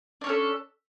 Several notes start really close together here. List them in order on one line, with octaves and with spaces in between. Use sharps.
D4 C#5 C#4 A4